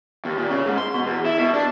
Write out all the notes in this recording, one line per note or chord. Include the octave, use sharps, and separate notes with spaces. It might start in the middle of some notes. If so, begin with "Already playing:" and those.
D#2
A#2
C#3
G#2
C6
B2
E2
E4
B2
D4